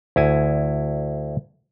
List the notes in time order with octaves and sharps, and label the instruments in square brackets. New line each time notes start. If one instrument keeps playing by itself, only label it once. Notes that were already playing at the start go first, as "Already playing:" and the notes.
[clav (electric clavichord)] D2 E4 G#5